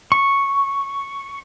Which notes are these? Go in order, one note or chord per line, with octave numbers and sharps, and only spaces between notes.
C#6